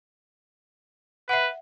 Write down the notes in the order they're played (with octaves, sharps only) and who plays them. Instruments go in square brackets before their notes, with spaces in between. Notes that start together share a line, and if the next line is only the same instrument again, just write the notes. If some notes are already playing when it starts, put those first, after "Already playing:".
[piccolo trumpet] B4 [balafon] E5 F#5